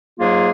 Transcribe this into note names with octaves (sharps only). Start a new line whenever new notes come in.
G#2 F#3 A#3 F4 G#4